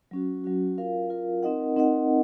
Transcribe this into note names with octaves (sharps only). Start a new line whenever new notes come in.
F#3 C#4 F#4
F#3 C#4 F#4
F4 A#4 F5
F4 A#4 F5
C4 D#4 A#4 D#5 F#5
C4 D#4 A#4 D#5 F#5